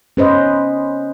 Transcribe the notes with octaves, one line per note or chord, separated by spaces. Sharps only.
C#4 B4 C5 D#5